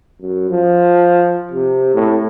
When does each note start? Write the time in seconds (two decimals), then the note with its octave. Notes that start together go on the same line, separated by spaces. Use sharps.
0.21 F#2
0.50 F3
1.52 C3
1.95 A2